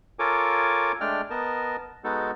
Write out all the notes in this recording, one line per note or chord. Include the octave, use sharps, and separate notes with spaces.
F4 A4 A#4 C#5 G#5 D6
G#3 A3 D4 D5 G5 F6
B3 A#4 D#5 A5
G#3 B3 D#4 F#4 A4